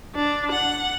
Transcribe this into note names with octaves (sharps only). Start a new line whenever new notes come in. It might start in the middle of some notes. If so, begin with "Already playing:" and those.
D4
F#5